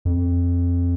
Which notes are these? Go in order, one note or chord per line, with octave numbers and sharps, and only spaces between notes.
F2